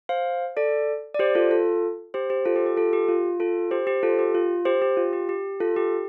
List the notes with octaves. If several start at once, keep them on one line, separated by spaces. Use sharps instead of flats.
C5 F5
A4 D5
D5
G4 C5
F4 A4
F4 A4
G4 C5
G4 C5
F4 A4
G4
G4
F4 A4
G4
F4
F4 A4
G4 C5
G4 C5
F4 A4
G4
F4
G4 C5
G4
F4
G4
G4
F4 A4
G4